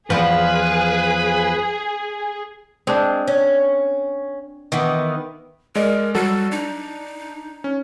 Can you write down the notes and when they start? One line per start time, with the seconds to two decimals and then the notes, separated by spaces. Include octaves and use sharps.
0.10 E2 F3 G#4 B4
2.87 G#3 C4 D4
3.28 C#4
4.72 D#3 E3 B3
5.75 G#3 A#4 D5 D#5
6.15 F#3 G3 F#4 A4
6.52 D4 D#4
7.64 C#4